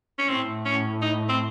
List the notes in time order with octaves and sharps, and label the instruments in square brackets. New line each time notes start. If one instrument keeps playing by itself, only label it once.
[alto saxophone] C#4
[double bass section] A2 [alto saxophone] C4
[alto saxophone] C#4
D#4
C4